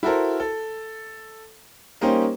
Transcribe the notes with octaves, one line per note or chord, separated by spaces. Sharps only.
E4 F#4 A4 A#4 C5
A4
G3 A#3 C#4 D#4 G4 C5